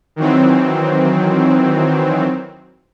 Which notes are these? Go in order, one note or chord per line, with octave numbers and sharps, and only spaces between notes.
D#3 E3 F#3 C4